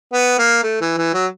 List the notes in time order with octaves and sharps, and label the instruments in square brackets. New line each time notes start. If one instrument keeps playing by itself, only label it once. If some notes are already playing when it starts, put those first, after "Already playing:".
[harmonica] B3
A#3
A3
E3
E3
F#3